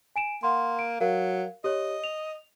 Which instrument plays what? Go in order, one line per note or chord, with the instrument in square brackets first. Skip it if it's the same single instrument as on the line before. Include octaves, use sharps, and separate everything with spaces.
[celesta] G#5 D7 E7
[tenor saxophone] A#3 [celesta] F#5 C6
[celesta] D7
[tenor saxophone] F#3 [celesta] A#4 F5
[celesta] G4 C#5 [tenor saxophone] D#5
[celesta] F7